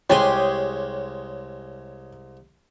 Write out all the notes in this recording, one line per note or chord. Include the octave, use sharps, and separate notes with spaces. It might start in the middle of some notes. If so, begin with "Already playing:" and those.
C2 G#3 G4 G#4 C#5 G#5 C6